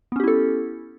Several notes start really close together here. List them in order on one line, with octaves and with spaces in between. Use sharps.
B3 C#4 G4 E4 A4